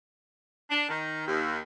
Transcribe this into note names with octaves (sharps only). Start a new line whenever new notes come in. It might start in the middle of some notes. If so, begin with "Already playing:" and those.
D4
D#3
D#2